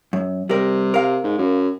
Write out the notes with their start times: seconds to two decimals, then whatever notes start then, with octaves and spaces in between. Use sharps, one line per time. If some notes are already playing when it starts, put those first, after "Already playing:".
0.13 F#2
0.50 C3 G3 A#4
0.94 A#4 F5
1.24 G#2
1.38 F#2